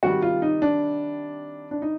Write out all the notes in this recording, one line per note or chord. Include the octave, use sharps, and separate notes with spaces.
C3 D#3 G3 F#4
F4
D#4
D4
D4
D#4